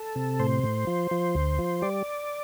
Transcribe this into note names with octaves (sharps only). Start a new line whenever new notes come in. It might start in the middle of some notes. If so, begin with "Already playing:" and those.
Already playing: A4
C3
A2 C5
A2
F3
F3
D2
F3
G3 D5